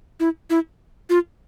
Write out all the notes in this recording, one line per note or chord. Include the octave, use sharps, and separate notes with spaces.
E4
E4
F4